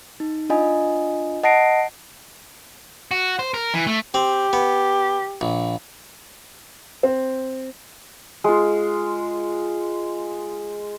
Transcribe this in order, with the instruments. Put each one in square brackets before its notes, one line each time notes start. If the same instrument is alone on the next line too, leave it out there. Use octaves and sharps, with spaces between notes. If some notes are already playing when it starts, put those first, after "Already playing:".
[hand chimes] D#4
D4 F4 D#5 G#5
D#5 F#5 A5 A#6 C7 D7
[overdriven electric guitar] F#4
C5
A#4
E3
A3
[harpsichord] C4 [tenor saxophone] G4
[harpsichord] B3
A#1
[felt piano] C4
[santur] G#3 F4